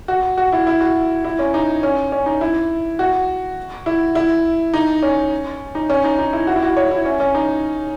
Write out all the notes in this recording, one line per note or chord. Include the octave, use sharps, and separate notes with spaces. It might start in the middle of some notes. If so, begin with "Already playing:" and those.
F#4
F#4
E4
E4
F#4
E4
C#4
D#4
C#4
C#4
D#4
E4
F#4
E4
E4
D#4
C#4
D#4
C#4
D#4
D#4
E4
F#4
E4
F#4
C#5
E4
C#4
C#4
D#4